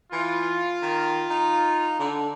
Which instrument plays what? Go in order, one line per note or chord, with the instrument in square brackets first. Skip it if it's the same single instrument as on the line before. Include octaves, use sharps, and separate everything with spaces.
[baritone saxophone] E3 [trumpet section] F4
[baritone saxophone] D#3
D#4
D3